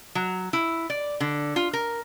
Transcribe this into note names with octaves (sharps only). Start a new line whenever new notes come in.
F#3
E4
D5
D3
F4
A#4